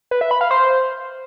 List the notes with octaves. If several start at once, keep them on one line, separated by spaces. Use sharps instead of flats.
B4
E5
B5
F5
C5